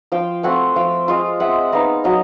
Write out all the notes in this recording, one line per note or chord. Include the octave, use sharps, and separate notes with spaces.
F3 F5 G5
A3 C4 F4 F#5 G#5
F3 F5 G5
G#3 C4 F4
G#3 E5 F#5
B3 D#4 D#5 F5
F#3 D#5 F5